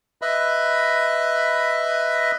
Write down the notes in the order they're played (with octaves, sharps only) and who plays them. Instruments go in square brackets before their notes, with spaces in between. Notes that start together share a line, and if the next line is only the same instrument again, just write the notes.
[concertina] B4 D#5 E5 B5